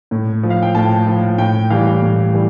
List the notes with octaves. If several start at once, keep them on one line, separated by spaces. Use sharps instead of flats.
A2
F3
F5
G5
A2 A5
F3
A2 G5
E3 G3 F5
A2
E3 G3